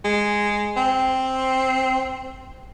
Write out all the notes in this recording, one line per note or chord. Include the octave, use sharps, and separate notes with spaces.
G#3
C4